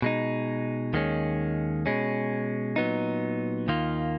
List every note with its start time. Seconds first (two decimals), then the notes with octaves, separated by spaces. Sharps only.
0.02 B2 G#3 D#4
0.94 D#2 D#3 G#3 C#4
1.86 B2 G#3 C#4
2.76 A#2 F#3 B3 D#4
3.68 D#2 D#3 A#3 F4